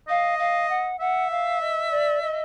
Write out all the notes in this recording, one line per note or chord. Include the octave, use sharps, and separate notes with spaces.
D#5 F5
F5
F#5
E5 F#5
F5
D#5
D5
D#5